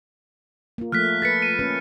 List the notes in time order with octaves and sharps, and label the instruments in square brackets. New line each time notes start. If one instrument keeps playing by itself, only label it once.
[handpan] A#3 F4
[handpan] F3 A3 A#3 [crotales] F6 F#6 B6
[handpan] A4 B4 [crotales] A6 B6 C#7
[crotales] D#7
[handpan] A#3 C#4 B4